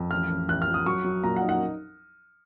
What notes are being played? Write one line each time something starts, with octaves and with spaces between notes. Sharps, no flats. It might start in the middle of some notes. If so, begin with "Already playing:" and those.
Already playing: F2
A1 F6
A1
A1 F#6
F6
F3
D#6
F#3 C#6
F#3
A#2 A#5
F#5
D#4
F#5